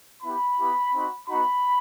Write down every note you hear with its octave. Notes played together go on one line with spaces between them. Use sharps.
B3 E4 G4 B5
B3 E4 G4
C4 D#4 F#4
B3 D#4 F#4 B5